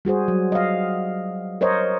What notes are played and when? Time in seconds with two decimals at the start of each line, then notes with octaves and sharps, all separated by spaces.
0.05 G3 F#4 G#4 C5
0.28 F#3
0.52 D#5 F5
1.61 A#4 C5 C#5 D#5